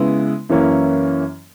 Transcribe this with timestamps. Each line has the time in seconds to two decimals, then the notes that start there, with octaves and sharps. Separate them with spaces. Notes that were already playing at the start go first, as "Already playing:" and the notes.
Already playing: C#3 G#3 B3 E4
0.49 F#2 E3 A#3 C#4 E4